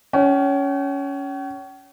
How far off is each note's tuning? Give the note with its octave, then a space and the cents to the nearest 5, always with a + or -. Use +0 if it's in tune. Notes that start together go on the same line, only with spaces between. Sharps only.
C#4 +15 G5 -45